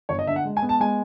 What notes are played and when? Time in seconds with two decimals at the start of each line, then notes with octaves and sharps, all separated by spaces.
0.09 G1 C#5
0.19 D#5
0.27 D3 E5
0.36 F#5
0.44 G#3
0.57 G#5
0.62 B3
0.69 A5
0.80 G#3 G#5